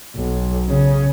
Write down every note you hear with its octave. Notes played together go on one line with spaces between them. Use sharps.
B1
C#3